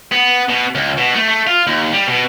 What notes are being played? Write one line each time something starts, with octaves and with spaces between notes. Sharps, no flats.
B3
B2
C#2
B2
A3
A3
F4
D#2
G3
B2